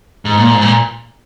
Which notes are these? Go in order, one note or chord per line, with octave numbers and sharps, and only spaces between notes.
G#2
A#2
G#2
A#2